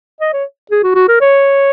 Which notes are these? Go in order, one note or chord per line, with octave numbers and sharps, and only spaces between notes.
D#5
C#5
G#4
F#4
F#4
A#4
C#5